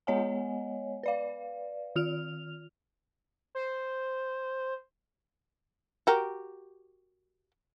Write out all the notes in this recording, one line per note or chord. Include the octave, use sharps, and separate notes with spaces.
G#3 B3 C#5 D#5 F#5 G#5
B4 D5 F5
D#3 F4 F6 F7
C5
F#4 G4 A#4